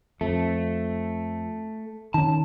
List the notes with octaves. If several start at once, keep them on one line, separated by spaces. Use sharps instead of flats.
F2 A3
D#3 C#4 A5